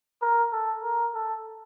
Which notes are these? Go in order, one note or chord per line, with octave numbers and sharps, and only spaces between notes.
A#4
A4
A#4
A4